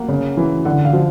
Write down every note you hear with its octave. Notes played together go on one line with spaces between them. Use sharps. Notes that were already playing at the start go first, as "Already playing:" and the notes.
Already playing: A#3 F#5
C#3
E3
D3 F#5
F5
F3